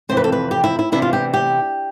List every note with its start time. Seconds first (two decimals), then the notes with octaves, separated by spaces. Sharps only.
0.09 F2 C3 E3 C4 C5
0.17 B4
0.24 A4
0.32 B4
0.51 G4
0.64 E4
0.79 E4
0.92 C3 E3 B3 D4 E4
1.02 F4
1.13 G4
1.34 G4